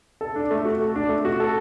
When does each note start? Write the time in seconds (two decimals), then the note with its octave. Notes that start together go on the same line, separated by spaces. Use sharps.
0.21 A4
0.35 D4
0.51 A3
0.65 F#4
0.80 A4
0.95 D4
1.09 A3
1.25 F#4
1.40 A4